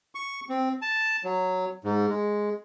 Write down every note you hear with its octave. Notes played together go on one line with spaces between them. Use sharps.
C#6
C4
A5
F#3
G#2
G#3